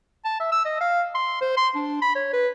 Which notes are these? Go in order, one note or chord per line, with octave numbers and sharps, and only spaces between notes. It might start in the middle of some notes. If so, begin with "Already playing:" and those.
A5
E5
E6
D#5
F5
C6
C5
C6
D4
B5
C#5
B4